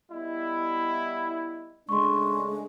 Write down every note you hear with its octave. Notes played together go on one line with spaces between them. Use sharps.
G3 B3 E4 D#5
C#3 G#3 A3 D4 C6 C#6